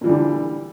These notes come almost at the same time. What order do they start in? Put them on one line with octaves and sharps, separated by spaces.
A#2 E3 G3 D3